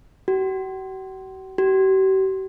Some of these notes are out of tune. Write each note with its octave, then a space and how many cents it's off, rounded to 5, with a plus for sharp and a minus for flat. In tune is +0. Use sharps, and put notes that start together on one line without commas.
F#4 +45
G4 -45